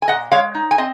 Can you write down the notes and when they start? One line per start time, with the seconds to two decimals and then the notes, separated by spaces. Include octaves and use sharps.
0.02 G#5
0.08 A#2 D#5 F#5
0.32 G#3 C#5 F5
0.55 D#4
0.71 G#5
0.78 C4 D#5